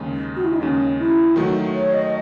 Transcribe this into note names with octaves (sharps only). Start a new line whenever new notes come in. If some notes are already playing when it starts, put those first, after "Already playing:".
Already playing: D#2 C#3 G#3
F#4
E4
D#4
D#2 C#3 G#3 C#4
E4
D#3 F#3 A3 F#4
C#5
D#5